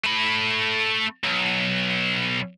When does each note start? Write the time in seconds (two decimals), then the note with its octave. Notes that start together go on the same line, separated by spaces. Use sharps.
0.04 A3 B5
1.24 B1